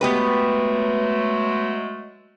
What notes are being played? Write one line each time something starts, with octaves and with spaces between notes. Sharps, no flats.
F#3 G#3 A3 B3 G4 B4